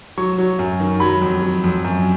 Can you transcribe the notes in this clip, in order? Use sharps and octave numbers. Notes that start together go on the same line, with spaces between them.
F#3 C#6
F#3
F#2
D#3
F#3 B5
F2
F#3
F2
F#2